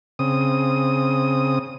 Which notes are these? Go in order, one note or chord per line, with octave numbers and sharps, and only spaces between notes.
C#3 C4 D#6